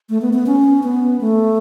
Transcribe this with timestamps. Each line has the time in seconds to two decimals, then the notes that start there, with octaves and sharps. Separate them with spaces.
0.10 A3
0.21 B3
0.33 B3
0.46 C#4
0.83 B3
1.21 A3